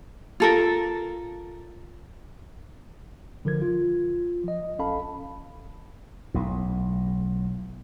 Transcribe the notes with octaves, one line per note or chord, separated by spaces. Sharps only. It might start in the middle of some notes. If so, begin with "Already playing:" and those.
F4 A4 A#4
D3 F3 A#4 G#6
F4
F3 D#5
A#1 C#4 A4 F5 A5 B5
B1 A2